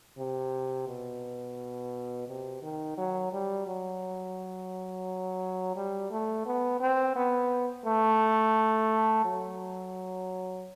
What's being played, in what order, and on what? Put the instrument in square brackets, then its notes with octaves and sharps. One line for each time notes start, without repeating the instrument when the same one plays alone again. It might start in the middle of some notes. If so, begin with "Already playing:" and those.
[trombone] C3
B2
C3
D#3
F#3
G3
F#3
G3
A3
B3
C4
B3
A3
F#3